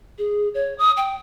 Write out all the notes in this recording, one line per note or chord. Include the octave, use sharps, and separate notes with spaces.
G#4
C#5
D#6
G5